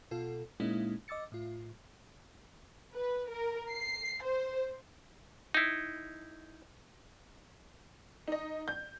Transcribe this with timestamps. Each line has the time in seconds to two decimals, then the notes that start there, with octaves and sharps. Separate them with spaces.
0.11 B2 F4 A4
0.60 A#2 G#3 A#3 C#4 D#4 E4
1.08 D#5 D6 E6 A6 C#7
1.32 A2 F4
2.93 B4
3.30 A#4
3.72 C7
4.23 C5
5.54 D#4 E4
8.28 D#4 D#5
8.68 G6